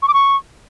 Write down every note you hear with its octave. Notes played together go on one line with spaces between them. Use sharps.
C#6
D6
C#6